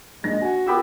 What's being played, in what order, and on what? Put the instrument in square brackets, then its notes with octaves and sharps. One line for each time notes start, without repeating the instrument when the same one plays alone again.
[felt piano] A#1 A#6 [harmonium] G#3
[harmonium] F#4 [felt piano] G#5
[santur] B3 G4 E6 [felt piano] F4 A#4